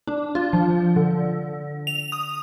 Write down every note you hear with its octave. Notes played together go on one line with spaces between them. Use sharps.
D4
F4
F3
D3
F7
D#6